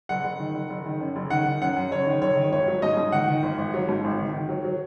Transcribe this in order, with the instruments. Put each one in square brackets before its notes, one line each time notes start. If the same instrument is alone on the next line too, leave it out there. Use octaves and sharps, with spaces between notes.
[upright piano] F#1 F#5
F#1
D#3
F#1
F#1
D#3
F#2
F#1
D#3 F#5
D#3
F#2 F#5
F#2
F#1 C#5
D#3
F#1 C#5
D#3
G#1 C#5
F#3
G#2 D#5
G#2
D#3 F#5
D#3
G#1
G#1
F#3
G#2
G#1
D#3
D#3
F#3
F#3